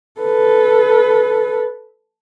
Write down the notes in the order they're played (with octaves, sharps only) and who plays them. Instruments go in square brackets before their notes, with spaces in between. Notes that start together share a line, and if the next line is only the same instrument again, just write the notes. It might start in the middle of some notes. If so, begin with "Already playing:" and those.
[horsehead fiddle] A4 B4